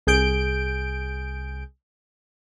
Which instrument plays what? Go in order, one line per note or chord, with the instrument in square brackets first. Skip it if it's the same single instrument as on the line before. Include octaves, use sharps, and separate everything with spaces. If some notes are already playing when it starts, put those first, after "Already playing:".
[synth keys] C2 G#4 G6 D7